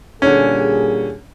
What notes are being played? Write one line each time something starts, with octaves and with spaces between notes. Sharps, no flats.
A#2 D3 G3 C#4 G#4